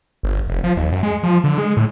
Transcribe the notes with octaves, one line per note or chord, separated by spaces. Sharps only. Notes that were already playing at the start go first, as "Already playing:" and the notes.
G1
F1
F3
D#2
F#2
G#3
F3
D3
G#3
A2